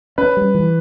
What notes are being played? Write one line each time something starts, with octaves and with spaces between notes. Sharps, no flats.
C#4 B4
G3
E3